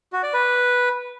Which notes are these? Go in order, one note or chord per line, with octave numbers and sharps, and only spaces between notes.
F#4
D5
B4